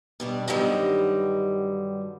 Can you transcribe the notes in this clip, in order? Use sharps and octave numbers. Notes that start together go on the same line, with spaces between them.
B2 G3 D4
G2 D3 D#3 F#3 G3 D#5